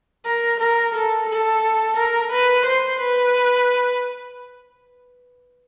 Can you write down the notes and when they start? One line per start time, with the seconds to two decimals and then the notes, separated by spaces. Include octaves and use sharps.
0.26 A#4
0.59 A#4
0.94 A4
1.29 A4
1.96 A#4
2.31 B4
2.65 C5
3.00 B4